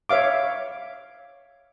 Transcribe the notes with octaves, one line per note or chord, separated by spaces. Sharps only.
C#5 E5 F5 D6